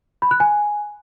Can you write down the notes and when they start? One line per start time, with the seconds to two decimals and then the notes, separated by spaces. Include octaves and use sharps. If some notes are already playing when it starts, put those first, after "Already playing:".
0.22 B5
0.31 F#6
0.40 G#5